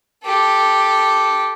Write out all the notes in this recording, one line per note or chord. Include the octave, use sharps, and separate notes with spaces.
G4 A4